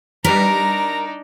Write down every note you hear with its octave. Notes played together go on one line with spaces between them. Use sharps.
G3 D4 D#4 A#4 B4 A#5 B6